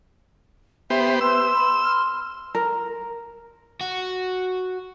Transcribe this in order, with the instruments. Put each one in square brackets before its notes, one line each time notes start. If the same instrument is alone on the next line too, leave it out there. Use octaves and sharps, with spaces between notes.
[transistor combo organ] B3 G4 C5 [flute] E5
[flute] B4 [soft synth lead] C6 [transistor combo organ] E6
[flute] B5
F6
[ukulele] A#4
[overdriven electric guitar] F#4